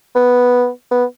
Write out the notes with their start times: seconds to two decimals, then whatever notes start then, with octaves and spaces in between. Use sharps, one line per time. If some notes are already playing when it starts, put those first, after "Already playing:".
0.15 B3
0.91 B3